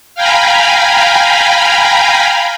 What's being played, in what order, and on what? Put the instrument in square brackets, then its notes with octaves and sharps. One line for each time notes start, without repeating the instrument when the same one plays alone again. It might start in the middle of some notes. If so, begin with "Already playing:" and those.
[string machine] F5 G5 G#5 A#5 B5